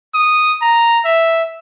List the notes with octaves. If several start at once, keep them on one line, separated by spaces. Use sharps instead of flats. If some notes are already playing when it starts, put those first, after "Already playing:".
D#6
A#5
E5